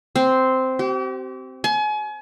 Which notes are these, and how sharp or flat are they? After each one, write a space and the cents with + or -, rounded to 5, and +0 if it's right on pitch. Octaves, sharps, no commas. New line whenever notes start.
C4 -5
G4 -40
G#5 +35